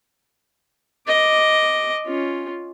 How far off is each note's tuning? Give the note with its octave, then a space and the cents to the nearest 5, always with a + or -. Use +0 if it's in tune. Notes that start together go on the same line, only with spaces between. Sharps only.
D#5 +0 D6 +0
C#4 +0 F4 +0